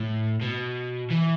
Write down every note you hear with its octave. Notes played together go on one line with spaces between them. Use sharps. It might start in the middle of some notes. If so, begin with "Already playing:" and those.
Already playing: A2
B2
E3